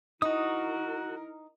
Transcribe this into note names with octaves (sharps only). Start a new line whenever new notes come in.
D#4 E4 F#4 A#4 D#6